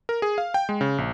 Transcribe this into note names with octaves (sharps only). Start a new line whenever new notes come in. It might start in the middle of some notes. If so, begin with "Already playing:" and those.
A#4
G#4
F5
G5
G#3
C#3
A#1